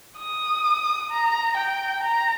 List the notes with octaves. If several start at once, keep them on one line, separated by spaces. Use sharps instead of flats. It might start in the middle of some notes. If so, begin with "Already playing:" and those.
D#6
A#5
G5
A#5